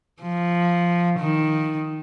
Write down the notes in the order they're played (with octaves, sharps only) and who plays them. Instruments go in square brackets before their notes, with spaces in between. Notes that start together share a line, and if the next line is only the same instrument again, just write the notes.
[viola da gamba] F3
D#3